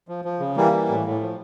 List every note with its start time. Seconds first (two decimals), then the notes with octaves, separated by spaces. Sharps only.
0.08 F3
0.25 F3
0.40 C#3
0.56 E3 G3 A#3
0.73 E3
0.89 A2
1.06 A2
1.21 F3